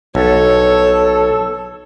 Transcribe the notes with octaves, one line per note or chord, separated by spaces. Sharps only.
B1 A4 C#5